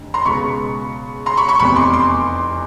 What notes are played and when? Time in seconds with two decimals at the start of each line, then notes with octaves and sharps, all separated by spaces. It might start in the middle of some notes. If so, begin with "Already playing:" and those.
Already playing: F1 D3
0.14 A#5 C6
0.25 C#2 B2 G#3 B5 C#6
1.26 A#5 C6
1.37 B5 C#6
1.48 B5 C#6
1.59 F1 E2 C3 B5 C#6
1.76 C6 D6
1.93 C6 D6